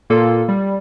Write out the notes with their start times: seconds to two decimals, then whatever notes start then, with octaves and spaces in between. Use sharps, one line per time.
0.10 A#2 A#3 F4 A4
0.48 G3